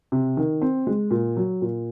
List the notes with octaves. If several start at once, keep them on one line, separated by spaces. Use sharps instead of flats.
C3
D#3
C4
G#3
A#2
F#3
A#2